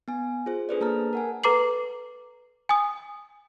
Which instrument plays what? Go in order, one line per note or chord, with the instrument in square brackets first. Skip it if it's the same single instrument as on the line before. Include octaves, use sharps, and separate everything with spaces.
[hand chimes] B3 G#5
F4 G#4 C5
D4 G#4 A4 B4 C5 D5
A#3 A5 A#5 F6
A#4 F#5 G#5
[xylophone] A4 B4 A#5 D6 C7 F#7
G#5 D#6